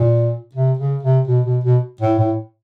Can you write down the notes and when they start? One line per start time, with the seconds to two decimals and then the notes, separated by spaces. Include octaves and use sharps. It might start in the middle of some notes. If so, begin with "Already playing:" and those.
Already playing: A#2
0.55 C3
0.79 C#3
1.03 C3
1.27 B2
1.45 B2
1.64 B2
2.01 A2
2.19 A2